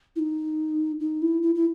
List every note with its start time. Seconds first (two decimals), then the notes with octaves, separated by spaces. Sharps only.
0.16 E4
0.19 D#4
1.00 D#4
1.22 E4
1.42 E4
1.55 E4